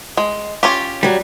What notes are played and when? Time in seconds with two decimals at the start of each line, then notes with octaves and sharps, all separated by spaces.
0.17 G#3
0.63 C#4 F4 G4
1.03 F#3 G3